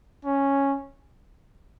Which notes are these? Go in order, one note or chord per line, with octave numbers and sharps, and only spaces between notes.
C#4